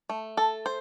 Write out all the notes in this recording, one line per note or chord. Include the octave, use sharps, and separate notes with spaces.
A3
A4
C5